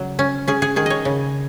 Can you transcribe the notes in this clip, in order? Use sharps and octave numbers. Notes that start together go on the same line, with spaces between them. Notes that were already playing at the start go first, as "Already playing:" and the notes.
Already playing: C#3 F#3
C#4
C#4 G#4
G#4
D#3 G#4
C#5 D#5
C#3